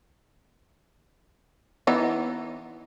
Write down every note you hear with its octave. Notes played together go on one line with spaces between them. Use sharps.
E3 B3 D#4